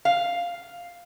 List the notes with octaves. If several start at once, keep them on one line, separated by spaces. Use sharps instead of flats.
F5